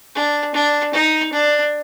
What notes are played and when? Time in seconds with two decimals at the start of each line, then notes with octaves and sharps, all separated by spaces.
0.15 D4
0.55 D4
0.94 D#4
1.33 D4